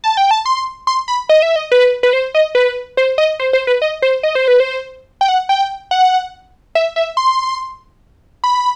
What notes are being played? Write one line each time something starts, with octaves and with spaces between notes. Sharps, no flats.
A5
G5
A5
C6
C6
B5
D#5
E5
D#5
B4
B4
C5
D#5
B4
C5
D#5
C5
C5
B4
D#5
C5
D#5
C5
B4
C5
G5
F#5
G5
F#5
E5
E5
C6
B5